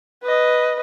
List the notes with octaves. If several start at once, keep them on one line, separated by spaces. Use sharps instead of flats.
B4 D#5